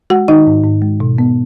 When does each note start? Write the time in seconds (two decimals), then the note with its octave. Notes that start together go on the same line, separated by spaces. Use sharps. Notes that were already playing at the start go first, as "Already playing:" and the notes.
0.10 G#3 F#4 F#5
0.28 D#3 D#4 D#5
0.46 G#2
0.64 G#2
0.82 G#3
1.00 B2
1.18 B3